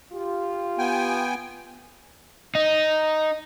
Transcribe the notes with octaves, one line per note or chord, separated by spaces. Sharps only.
F4 G4
B3 G5 G#5
D#4